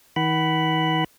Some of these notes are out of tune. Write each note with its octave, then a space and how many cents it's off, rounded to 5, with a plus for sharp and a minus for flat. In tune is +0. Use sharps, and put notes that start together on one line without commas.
D#3 +45 F#5 +30 B5 +0